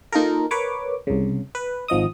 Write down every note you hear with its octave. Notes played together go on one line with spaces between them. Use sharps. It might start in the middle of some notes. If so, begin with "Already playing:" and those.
A#3 D#4 F4 A4 A#4
A#4 B4 C#5 D6
C2 C#3
B4
G#1 F3 D#5 D#6